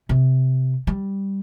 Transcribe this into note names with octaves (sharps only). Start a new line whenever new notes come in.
C3
G3